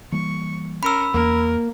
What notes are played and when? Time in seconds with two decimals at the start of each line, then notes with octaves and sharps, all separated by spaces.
0.12 E3 G3 A#3 C#6
0.83 C#4 A#4 B5 E6
1.14 E2 A#3 A#4